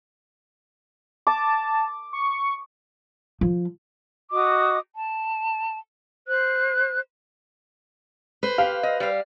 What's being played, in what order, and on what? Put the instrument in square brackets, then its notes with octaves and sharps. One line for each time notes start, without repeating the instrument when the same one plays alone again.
[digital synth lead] A5 [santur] D6
[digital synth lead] C#6
[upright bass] F3
[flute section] F#4 D#5 D6 D#6
A5
C5 F#6
[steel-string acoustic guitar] B4 C5
[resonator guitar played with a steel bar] G4 [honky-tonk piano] F5
[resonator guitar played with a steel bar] D#5
G3 F5